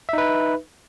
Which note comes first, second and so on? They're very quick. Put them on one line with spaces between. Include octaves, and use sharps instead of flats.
E5 D#4 B4